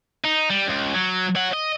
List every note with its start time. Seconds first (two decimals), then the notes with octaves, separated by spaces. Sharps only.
0.25 D#4
0.50 G3
0.67 C#2
0.94 F#3
1.35 C#5 F#5
1.53 D#5